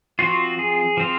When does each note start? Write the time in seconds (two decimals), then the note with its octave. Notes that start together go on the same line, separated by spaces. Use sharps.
0.19 F3 C4 F4 F#4
0.59 G#4
0.97 F3 C4 F4